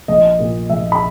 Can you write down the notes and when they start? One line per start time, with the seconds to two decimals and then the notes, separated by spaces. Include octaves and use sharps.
0.08 A#1 D#5
0.39 A#2 A#3
0.70 A#1 E5
0.92 B5